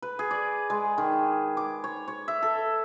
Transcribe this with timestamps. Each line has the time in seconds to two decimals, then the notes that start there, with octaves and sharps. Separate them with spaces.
0.02 B4
0.19 G#4
0.31 D5
0.70 G#3
0.98 D#3
1.57 D6
1.84 C#5
2.08 C#5
2.28 E5
2.43 A4